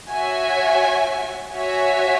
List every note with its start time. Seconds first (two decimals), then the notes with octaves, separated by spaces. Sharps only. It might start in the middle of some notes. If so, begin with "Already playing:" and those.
0.11 F#4 C#5 E5 G#5
1.54 F#4 C#5 E5 G#5